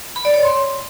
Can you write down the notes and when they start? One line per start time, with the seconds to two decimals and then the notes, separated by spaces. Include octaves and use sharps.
0.16 B5
0.25 D5
0.34 C#5
0.43 C6